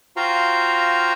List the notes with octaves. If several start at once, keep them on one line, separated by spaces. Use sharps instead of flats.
F4 F#4 C5 F5 G5 A#5